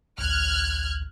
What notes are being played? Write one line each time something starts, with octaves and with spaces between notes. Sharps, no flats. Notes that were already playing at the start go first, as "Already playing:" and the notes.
A1 D2 F6 F#6 G#6